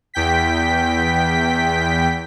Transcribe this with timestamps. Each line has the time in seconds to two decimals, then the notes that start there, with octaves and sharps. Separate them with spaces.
0.14 E2 G5 B6